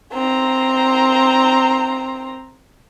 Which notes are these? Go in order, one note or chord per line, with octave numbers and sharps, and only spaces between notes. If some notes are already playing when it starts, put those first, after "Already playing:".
C4 A#5